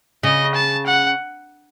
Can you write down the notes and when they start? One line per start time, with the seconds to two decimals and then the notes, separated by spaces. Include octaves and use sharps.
0.23 C#3 D#5
0.55 A5
0.86 F#5